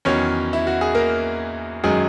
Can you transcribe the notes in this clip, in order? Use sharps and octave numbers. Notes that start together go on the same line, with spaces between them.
E2 D#3 F#3 C#4 C#5
E4
F#4
G#4
A#3 A#4
F#2 D#3 F#3 G#3 G#4